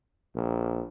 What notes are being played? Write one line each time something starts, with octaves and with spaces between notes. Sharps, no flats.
A#1